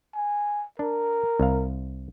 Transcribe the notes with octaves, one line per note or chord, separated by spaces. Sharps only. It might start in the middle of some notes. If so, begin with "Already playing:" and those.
G#5
D4 A#4
C2 F5